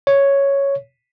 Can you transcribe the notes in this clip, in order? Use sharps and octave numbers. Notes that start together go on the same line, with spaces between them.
C#5